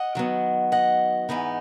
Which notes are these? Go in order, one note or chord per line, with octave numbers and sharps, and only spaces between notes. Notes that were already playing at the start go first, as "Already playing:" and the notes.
Already playing: D#5 F#5
D#3 F#3 B3
D#5 F#5
G#2 E3 B3 D#4